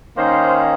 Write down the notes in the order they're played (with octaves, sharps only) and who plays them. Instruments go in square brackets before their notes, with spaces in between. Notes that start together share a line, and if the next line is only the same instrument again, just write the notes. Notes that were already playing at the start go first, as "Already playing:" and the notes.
[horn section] D#3 A#3 C#4 C5